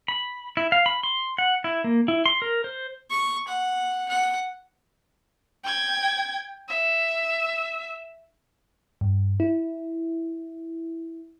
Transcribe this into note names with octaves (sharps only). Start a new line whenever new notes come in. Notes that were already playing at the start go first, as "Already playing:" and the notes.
B5
E4
F5
B5
C6
F#5
E4
A#3
E4
C6
A#4
C5
C#6
F#5
F#5
G5 G#6
E5
G2
E4